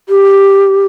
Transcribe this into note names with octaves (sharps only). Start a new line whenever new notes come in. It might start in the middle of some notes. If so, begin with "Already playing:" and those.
G4